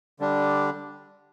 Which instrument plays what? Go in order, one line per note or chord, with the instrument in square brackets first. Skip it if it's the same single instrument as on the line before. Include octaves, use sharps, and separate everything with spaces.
[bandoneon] D3 G3 D4